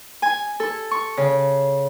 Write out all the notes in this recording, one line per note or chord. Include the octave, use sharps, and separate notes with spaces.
G#5
A4
C#6
C#3